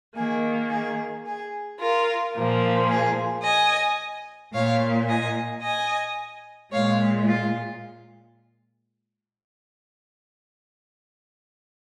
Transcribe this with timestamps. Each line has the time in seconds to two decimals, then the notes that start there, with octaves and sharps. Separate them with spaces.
0.16 D#3 A#3 G#4
0.71 G#4
1.26 G#4
1.80 F4 A#4
2.34 A#2 F3 A#3
2.90 G#4
3.44 D#5 G#5
4.54 A#2 A#3 C#5 F5
5.09 D#5 G#5
5.63 D#5 G#5
6.73 A#2 G#3 C#5 F5
7.27 F4